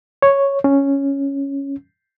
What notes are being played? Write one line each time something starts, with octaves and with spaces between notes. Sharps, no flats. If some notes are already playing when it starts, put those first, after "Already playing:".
C#5
C#4